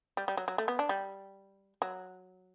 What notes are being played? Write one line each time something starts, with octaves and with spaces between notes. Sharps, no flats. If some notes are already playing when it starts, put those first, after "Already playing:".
G3
G3
F#3
F#3
A3
B3
D4
G3
F#3